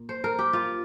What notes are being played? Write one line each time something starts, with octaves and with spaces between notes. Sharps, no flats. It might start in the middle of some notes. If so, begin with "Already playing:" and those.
Already playing: A#2
C5
A#4
G4
F4